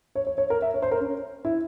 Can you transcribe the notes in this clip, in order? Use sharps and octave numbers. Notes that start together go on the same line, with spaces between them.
C#5
C#5
C#5
A#4
E5
C#5
C5
A#4
C#4
E4